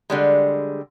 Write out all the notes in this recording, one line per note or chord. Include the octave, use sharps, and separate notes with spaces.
D3 G3 G#3